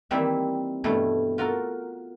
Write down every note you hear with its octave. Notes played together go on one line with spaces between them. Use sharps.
D#3 E3 G3 A#3 C4 E5
G2 B2 E3 A3
F4 F#4 A4 A#4